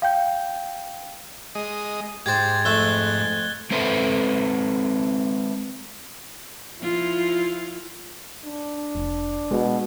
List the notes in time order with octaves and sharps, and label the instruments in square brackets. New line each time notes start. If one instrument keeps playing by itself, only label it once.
[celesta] F5 G5 G6
[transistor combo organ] G#3 D#5
[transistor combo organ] G#2 [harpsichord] G4 C5 [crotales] G#6 A6
[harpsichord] F2 A3 E5 [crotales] F#6 G7
[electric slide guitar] G#3 C4 A4 B4 E5
[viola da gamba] F3 E4 F4
[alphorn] D4
[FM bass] F1
[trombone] B2 [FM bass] G#3